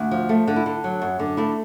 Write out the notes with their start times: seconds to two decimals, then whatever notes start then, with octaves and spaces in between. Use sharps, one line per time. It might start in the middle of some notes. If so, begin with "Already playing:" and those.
Already playing: D2
0.11 F3
0.29 A3
0.48 D3
0.56 E4
0.66 D3
0.84 F#3
1.02 F#2
1.19 D3
1.37 A3 E4